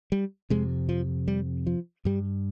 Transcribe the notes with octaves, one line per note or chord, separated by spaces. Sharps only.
G3
F2 C3 G#3
F3
G3
F3
G2 G3